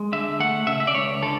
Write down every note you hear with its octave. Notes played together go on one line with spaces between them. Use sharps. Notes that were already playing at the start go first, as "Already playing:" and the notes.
Already playing: G#3
D3 E5
A3 F#5
C#3 E5
E5
D5
C#2 C#5
D3 A4